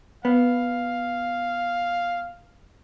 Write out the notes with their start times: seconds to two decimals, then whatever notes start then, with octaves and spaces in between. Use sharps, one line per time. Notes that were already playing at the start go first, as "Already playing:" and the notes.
0.25 B3 F5